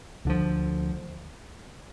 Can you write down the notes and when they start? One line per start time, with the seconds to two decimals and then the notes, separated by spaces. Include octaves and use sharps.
0.25 D2 D3 F3